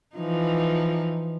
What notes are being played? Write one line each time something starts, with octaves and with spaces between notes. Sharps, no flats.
E3 F3 D#4